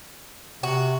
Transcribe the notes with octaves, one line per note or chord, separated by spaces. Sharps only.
C3 F#4